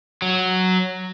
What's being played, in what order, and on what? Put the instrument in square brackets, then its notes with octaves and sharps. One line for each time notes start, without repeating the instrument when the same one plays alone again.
[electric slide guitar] F#3